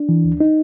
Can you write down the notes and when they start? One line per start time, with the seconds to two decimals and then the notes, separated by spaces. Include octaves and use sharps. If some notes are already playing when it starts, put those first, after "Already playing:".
Already playing: D4
0.09 E3
0.24 D2
0.40 D#4